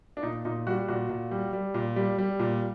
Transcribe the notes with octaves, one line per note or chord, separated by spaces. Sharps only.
D4
A#2 D#4
A#2 D#4
G3 F#4
A#2 F#4
A#2
G3
G3
A#2
G3
G3
A#2